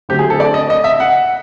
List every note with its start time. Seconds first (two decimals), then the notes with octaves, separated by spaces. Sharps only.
0.09 D3 F#3 A3 C4 G4
0.19 G#4
0.30 A4
0.40 D5
0.54 D#5
0.70 D#5
0.84 E5
1.00 F#5